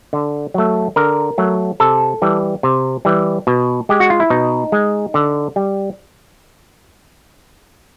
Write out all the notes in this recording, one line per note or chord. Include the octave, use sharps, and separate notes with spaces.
D3
F#3 A3
D3 A#4
F#3 A3
C3 A4
E3 G3
C3
E3 G3
B2
G#3 G4
F#4
F4
E4
B2 D#4
G#3
D3
G3